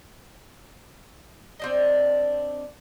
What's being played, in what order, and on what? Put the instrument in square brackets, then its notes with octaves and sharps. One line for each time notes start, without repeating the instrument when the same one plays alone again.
[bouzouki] C4 D4 D#5